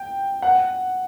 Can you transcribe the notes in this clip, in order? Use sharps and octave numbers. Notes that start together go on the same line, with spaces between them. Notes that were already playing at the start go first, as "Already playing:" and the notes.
Already playing: G5
F#5